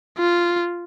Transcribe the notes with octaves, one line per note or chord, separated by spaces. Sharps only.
F4